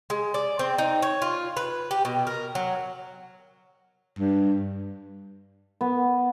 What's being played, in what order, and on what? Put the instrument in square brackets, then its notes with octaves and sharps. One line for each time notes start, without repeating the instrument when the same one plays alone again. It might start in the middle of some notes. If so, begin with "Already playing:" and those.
[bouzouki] G#3
D5
C4
D#4
C#5
F4
B4
G4
B2
A#4
F#3
[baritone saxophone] G2
[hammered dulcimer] B3